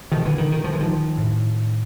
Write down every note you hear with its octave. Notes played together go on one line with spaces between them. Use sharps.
A#2 D#3 F3
D3 E3
D#3
D#3
F3
E3
D#3 F3
A2